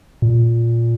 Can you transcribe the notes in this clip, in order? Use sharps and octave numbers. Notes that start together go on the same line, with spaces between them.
A#2